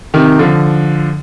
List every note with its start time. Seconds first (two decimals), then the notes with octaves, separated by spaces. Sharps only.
0.14 C3 D#3
0.39 D3 F3